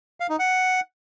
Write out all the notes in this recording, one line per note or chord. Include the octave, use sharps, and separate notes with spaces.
F5
D#4
F#5